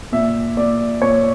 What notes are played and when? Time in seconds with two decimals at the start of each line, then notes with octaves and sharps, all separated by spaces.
0.12 A#2 E5
0.57 A#2 D5
1.02 A#2 C#5